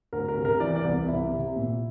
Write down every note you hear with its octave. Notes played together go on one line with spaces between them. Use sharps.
D2 A#4
A#4
C3
A#4
E3 D5
D5
C2
C2 E4
C3
A#2